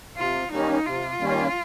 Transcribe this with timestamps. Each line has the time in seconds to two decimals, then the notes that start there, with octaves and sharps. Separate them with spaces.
0.17 C3 F4
0.51 D#3 G3 A#3 C#4 D#4
0.86 C3 F4
1.20 D#3 G3 A#3 C#4